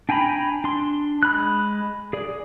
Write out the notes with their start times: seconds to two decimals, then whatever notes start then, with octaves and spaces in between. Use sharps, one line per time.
0.09 D4 G5 G#5 A#5 B5
0.64 D4 C6
1.23 G#3 B5 F#6
2.13 G#4 D5